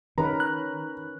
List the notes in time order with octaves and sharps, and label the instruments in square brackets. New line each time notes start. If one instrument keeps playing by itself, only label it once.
[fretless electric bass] D#3 [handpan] C#4 A#4 B4 [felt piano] A#5
[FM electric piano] F#6